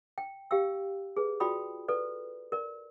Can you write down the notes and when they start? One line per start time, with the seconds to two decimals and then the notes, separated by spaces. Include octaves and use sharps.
0.18 G5
0.51 G4 F5 G5 E6
1.17 G#4 B4
1.40 F4 F#4 D5 G5 B5 D#6
1.88 A4 B4 D5
2.52 A#4 D5